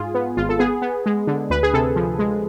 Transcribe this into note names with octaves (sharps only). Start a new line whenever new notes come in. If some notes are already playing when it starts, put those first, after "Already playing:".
Already playing: G#2 F4 G#4
B3
G#1 F4
A4
B3 G#4
B3
G#3
D3
D2 B4
G#4
C3 A4
F3
G#3